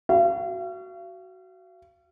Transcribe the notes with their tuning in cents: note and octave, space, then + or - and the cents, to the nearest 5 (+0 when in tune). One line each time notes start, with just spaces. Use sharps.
F#4 +10 F5 -40